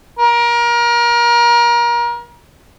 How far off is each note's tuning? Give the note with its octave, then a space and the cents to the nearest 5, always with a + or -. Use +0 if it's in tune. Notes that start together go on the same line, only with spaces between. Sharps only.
A#4 +30